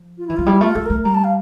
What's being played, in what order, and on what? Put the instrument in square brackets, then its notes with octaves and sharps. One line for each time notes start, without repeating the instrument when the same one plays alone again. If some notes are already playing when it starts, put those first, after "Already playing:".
Already playing: [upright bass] F3
[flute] F4
[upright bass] E3 [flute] E4
[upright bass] F3 [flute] F4
[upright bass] G3 [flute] E4
[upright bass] A3 [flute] F4
[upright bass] A3 [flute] A4
[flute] A#4
[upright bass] A3
[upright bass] G3 [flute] A#5
[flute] A5
F5